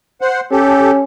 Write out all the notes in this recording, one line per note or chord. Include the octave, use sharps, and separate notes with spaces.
C5 F#5
C#4 G4 A4